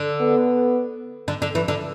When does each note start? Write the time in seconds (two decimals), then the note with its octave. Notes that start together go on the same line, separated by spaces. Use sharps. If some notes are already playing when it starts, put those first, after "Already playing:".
Already playing: D3
0.21 B3
1.28 D3
1.42 D3
1.55 E3
1.68 D3